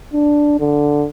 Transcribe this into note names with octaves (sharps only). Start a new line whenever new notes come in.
D4
D3